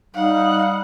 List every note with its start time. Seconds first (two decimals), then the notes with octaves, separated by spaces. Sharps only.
0.15 G3 D#4 F5 F#5